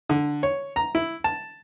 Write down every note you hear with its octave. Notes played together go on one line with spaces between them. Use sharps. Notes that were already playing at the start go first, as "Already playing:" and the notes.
D3
C#5
A#5
E4
A5